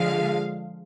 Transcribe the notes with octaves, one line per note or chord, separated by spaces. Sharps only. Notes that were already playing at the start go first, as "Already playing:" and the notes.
Already playing: D3 F3 G#3 F5